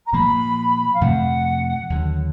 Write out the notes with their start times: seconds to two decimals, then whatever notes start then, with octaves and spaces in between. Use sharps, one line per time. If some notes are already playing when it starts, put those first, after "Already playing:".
0.06 A#5
0.13 A#2 F3 A#3 B5
0.94 F5
1.01 F2 C3 F3 A3 F#5
1.90 D#2 D3 F#3